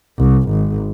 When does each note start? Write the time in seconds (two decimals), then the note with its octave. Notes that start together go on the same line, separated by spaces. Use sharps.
0.18 C2
0.50 G#1